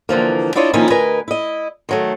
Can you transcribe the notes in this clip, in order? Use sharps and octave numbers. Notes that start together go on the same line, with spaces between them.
D3 E3 F3 A#3
D4 E4 F4 C#5 D#5
D#3 F3 A#3 C#4 D#4 E4
D2 A#4 B4 D#5 G#5
E4 D#5
D#3 F#3 A3